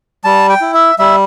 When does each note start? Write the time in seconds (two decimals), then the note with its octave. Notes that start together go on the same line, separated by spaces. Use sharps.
0.24 G3 A5
0.49 G5
0.61 E4
0.74 E5
0.99 G3 E5